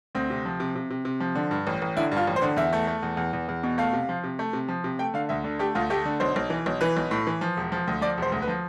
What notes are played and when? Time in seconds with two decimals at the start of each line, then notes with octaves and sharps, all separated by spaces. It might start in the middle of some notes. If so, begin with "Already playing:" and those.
0.15 D2 C4
0.30 C3
0.46 F3
0.60 C3
0.75 C3
0.90 C3
1.05 C3
1.20 F3
1.35 D3
1.51 G2
1.67 A1
1.82 A1
1.96 D3 E4
2.12 G2
2.17 F4
2.27 A1
2.36 C5
2.42 D3
2.56 E2 E5
2.73 A3
2.87 A3
3.02 E2
3.17 E2
3.33 E2
3.48 E2
3.63 B2
3.78 A3 F5
3.93 C3
4.09 F3
4.24 C3
4.39 A3
4.53 C3
4.68 F3
4.84 C3
4.99 A3 G5
5.14 D3 F5
5.29 D2 E5
5.44 D3
5.59 A3 G4
5.75 D2 F4
5.90 A3 G4
6.05 D3
6.20 B1 C5
6.36 B1
6.50 E3
6.66 B1
6.81 E3 B4
6.97 B1
7.11 A2
7.27 E3
7.41 F3
7.57 E1
7.72 F3
7.87 D2
8.01 F3 D5
8.17 E1 C5
8.32 D2
8.42 B4
8.48 F3